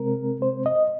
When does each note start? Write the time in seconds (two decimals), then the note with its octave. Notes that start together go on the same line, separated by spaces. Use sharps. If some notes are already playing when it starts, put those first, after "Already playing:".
Already playing: C3 G#3 C4 A#4
0.42 C5
0.66 D#5